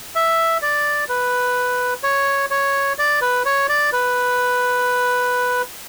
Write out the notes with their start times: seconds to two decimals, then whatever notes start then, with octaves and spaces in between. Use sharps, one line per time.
0.15 E5
0.62 D5
1.09 B4
2.03 C#5
2.51 C#5
2.98 D5
3.22 B4
3.46 C#5
3.69 D5
3.92 B4